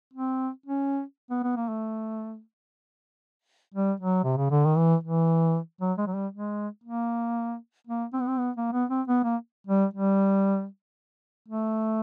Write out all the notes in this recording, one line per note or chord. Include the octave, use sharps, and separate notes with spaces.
C4
C#4
B3
B3
A#3
A3
G3
F#3
C3
C#3
D3
D#3
E3
E3
F#3
G#3
F#3
G3
G#3
A#3
A#3
C4
B3
C4
B3
A#3
B3
C4
B3
A#3
G3
G3
A3